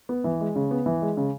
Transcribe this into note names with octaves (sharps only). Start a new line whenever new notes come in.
B3
E3
G#3
C#3
B3
E3
G#3
C#3